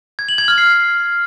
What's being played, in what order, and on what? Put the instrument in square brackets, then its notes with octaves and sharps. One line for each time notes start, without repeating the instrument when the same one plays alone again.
[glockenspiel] G#6
F#7
G#6
F6
C7